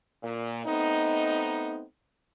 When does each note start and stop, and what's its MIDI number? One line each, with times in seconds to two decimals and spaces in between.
0.22 0.62 46
0.65 1.82 57
0.65 1.82 59
0.65 1.82 60
0.65 1.82 63